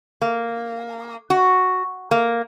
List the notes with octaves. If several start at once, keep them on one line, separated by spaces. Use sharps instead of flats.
A#3
F#4
A#3